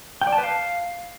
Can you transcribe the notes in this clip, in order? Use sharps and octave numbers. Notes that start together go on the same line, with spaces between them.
G5
D5
A5
B4
F5